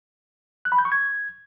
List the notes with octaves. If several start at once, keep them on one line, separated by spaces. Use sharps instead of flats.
F#6
B5
G6
C#6
G#6